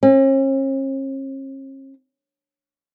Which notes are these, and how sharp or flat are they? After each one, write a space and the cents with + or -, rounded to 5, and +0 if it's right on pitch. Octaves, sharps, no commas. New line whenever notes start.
C#4 -45